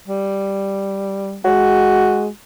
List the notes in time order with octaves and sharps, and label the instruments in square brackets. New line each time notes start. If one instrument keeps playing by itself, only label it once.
[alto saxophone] G3
[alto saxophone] G#3 [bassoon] F#4